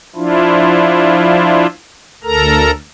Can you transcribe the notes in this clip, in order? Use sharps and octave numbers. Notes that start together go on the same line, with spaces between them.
F3 D4 E4 F4
D2 A4 A#4 A#5